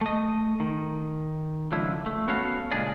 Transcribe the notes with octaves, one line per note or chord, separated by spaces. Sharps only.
A3 D#5
D#3
C#2 D3 F3 E4
A3
B3 C#4 F#4 A4 F5
C#2 A#2 G#3 D4 G#4 D5